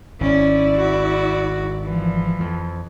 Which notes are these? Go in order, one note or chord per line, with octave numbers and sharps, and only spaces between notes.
G#1 C#4 E4 D5
F#4
E3 F3
F2